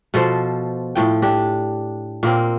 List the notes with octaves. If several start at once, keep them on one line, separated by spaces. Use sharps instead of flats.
B2 F3 A4 C5
A2 F3 G5
D4 G4
A#2 A#3 C4